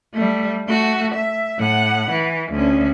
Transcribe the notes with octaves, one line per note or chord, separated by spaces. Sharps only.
G3 A3
A3 F#4
E5
A2 F#5
E3
D2 C#4